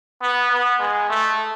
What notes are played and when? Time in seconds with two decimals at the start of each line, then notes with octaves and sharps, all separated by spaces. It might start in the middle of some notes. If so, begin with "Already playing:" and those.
0.22 B3
0.51 B3
0.80 G#3
1.09 A3